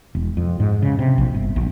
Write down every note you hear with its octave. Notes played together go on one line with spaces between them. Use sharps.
E1
F2
G#2
C#3
C3
A#1
G1
A#1